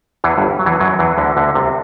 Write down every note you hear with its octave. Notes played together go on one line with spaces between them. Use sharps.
E2 E3
G1 G2
F#3
E2 E3
F#2 F#3
E2 E3
D2 D3
D2 D3
C2 C3